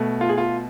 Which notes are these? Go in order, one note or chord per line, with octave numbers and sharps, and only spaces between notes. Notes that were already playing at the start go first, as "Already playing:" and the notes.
Already playing: B2 A3
F4
G#4
F4